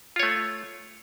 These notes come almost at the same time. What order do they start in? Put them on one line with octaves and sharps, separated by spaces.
F4 C#5 A3